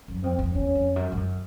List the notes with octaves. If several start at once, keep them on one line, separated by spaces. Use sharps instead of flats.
F#2
F2 C4
F2
E2 C#4
F2
F#2
G2
F#2